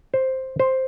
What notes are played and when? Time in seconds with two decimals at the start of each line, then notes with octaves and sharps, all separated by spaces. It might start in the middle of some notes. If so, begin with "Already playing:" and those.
0.14 C5
0.60 C5